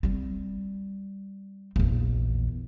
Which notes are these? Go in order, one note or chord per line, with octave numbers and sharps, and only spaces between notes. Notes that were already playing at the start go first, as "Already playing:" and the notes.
G3 C4
A#1 E2